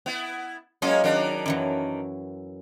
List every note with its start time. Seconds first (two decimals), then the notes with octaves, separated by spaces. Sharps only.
0.06 B3 E4
0.82 F#3 G#3 A#3 C#4 F4 D#5
1.04 D#3 F#3 D4 A#4
1.46 F#2 E3 F#3